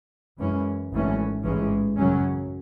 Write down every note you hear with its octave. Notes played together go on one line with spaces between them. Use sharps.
F#2 E3 G#3 C#4
G#1 F#2 E3 A3 C#4
A1 G#2 E3 G#3 C#4
F#2 C#3 F#3 C#4